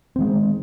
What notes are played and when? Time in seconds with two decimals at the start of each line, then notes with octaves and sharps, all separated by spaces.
0.16 C4
0.18 D#3
0.21 G#3